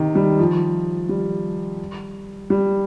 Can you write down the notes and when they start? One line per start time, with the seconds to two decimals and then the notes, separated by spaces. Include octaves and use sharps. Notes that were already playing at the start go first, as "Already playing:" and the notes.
Already playing: C3 D#3
0.15 G3
0.39 F3
1.09 G3
2.50 G3